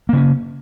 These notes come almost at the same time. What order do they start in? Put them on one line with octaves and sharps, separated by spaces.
A#3 C#3 C#4